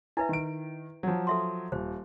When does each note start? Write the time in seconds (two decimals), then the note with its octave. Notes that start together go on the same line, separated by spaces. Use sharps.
0.17 E4 B4 E5 G#5
0.29 D#3 D7
1.03 F3 F#3
1.27 A4 E5 C6
1.72 D#1 C5